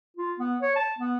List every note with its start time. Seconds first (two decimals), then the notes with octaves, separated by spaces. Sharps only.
0.17 F4
0.39 B3
0.62 C#5
0.76 A5
0.99 B3